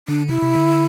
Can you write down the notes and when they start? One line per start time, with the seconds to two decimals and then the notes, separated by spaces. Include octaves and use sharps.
0.08 D3 D4
0.29 C3 E4
0.42 C3
0.55 D3